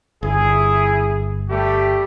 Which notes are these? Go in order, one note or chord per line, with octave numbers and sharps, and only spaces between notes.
G1 E4 G#4
G3 A3 G4